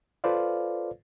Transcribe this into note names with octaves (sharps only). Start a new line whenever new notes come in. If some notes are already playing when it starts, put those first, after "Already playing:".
F4 A4 B4 C5 D5 F5